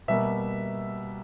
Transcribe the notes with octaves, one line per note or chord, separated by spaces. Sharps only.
B2 G3 A#3 E5